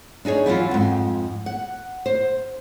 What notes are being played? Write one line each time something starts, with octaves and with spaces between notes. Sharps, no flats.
D4 D#4 G#4 C#5
E3 F#3 C#4 F4
F2 G#2
F#5
C5